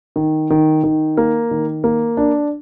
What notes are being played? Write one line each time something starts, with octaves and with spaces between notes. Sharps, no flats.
D#3
D#3
D#3
A#3
D#3
A#3
D4